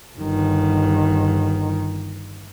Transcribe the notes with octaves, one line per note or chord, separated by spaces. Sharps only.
G1 D#3